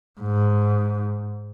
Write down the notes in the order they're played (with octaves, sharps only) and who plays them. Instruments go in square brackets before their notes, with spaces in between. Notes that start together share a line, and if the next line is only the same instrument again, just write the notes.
[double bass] G#2